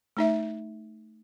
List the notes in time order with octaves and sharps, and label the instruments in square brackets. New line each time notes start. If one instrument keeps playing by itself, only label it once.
[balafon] A3 D#4 E5